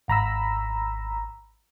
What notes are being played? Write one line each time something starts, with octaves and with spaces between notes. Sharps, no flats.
G#1 A#5 B5 E6